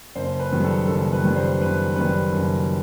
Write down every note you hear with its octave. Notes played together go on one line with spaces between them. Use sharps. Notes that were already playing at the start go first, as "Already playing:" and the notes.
F#1 C5
B4
F#2 D#3 G3
A4
F#1 A4
B4
F#2 D#3 G3
C5
F#1 B4
F#2 D#3 G3 B4
F#1